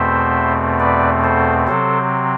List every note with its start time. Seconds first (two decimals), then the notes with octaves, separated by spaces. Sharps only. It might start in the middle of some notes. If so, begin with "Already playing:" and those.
Already playing: E2 B2 A3 C4 C5 E5
0.80 B4 D5
1.24 A4 C5
1.67 C3 F#3 C4 A4 C5